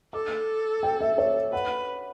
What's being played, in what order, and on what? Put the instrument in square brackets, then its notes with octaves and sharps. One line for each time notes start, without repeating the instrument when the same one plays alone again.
[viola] A4 [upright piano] D6
[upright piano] G5
E5
C#5
[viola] B4 [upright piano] F#5